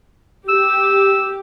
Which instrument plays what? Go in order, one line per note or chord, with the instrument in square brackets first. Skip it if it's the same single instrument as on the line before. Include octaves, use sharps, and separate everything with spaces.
[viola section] G4 [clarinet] E6